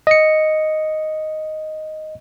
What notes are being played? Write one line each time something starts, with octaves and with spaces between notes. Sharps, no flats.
D#5 C#7